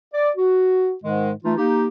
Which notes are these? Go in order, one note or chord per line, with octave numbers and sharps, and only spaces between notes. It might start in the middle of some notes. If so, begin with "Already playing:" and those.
D5
F#4
G#2 D#3 G#3
E3 A3 D#4 F4
A#3 D#4 G4